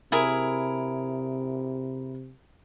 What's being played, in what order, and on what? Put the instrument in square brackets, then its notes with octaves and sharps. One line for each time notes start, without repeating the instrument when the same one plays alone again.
[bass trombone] C3 [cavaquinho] E4 G#4 A#4